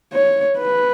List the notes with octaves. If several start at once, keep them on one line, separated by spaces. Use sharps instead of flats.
C#5
B4